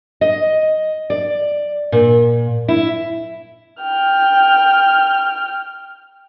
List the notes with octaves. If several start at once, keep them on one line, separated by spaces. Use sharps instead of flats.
D#5
D5
A#2
E4
G5 F6